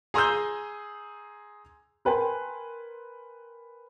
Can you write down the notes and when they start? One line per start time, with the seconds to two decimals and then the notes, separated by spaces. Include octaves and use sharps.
0.14 G#4 A#5 C6 D#6 E6 G6
2.05 A#4 B4 G5 G#5 C6